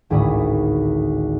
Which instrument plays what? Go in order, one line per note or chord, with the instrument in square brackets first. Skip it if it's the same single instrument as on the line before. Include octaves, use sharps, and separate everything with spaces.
[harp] G#1 D2 A2 D5 B5 D#6